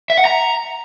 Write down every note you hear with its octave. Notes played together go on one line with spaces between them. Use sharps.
E5
F#5
A#5